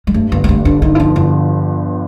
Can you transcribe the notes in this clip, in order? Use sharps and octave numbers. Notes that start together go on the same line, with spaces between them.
G#3
G2 A3
G1 A#3
A#3
G2 A3
D3 D4
G2 D#4
E4
F3 D#4
G1 E4